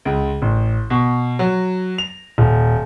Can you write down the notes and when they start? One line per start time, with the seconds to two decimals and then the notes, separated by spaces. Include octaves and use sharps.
0.05 C#2
0.42 A1
0.90 B2
1.39 F#3
1.98 F7
2.38 D#1